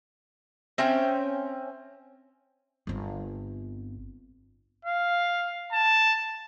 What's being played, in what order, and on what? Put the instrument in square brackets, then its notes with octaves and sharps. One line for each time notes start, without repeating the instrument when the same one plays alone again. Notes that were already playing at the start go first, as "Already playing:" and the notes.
[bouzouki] C4 C#4 E5 G5
[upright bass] G1 C4
[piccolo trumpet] F5
A5